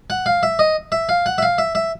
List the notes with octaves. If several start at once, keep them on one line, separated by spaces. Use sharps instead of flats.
F#5
F5
E5
D#5
E5
F5
F#5
E5
F5
E5
E5